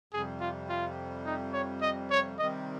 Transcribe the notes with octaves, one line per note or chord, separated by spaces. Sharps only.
F2 C3 G3 G#4
F4
F4
D#4
C#5
D#5
C#5
C3 D#3 G3 C4 D#5